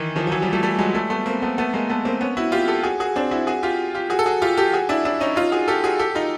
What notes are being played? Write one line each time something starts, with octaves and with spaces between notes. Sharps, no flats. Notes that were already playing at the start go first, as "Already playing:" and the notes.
Already playing: D#3 E3
D#3 F3
F3
E3 F#3
F3 G3
G3 A3
G3 A3
F#3 G#3
G3 A3
A3 B3
A#3 C4
A3 B3
A3 B3
G#3 A#3
A3 B3
A#3 C4
B3 C#4
E4 F#4
F4 G4
G4 A4
F#4 G#4
F#4 G#4
C4 D4
E4 F#4
F#4 G#4
F4 G4
F4 G4
F#4 G#4
A4
F#4 G#4
F4 G4
G4 A4
F#4 G#4
D4 E4
D4 E4
C#4 D#4
D#4 F4
F#4 G#4
G4 A4
F#4 G#4
G4 A4
D#4 F4